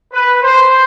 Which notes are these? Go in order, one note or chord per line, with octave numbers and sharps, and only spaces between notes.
B4
C5